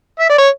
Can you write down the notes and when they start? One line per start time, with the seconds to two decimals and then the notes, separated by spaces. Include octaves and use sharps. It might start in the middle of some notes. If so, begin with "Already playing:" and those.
0.19 E5
0.29 D5
0.38 C#5